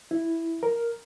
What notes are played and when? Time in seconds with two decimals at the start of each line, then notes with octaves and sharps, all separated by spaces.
0.11 E4
0.63 A#4